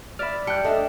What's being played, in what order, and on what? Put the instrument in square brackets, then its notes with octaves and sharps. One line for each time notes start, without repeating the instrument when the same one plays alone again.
[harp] D5 E5 [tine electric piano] B5 F6
[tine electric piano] F2 A5 C#7 [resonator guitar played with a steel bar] G3 [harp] G5 F#6
[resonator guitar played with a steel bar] A3 D4 [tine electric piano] A4 D#5 E5